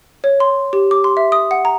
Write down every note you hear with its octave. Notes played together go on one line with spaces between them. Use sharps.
C#5
C6
G4
D6
C6
E5
D#6
F#5
A#5